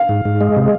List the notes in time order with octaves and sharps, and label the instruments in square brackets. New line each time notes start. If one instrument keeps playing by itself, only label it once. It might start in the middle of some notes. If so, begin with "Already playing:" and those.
Already playing: [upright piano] F5
[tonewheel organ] G#2
G#2
G#3
C3